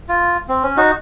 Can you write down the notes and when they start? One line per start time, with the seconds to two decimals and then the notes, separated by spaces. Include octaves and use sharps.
0.09 F4
0.49 C4
0.63 C#4
0.77 D#4 F#4